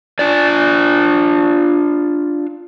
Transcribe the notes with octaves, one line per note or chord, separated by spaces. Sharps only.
D4 F4 D5